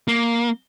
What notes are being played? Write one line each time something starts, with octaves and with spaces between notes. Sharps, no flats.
A#3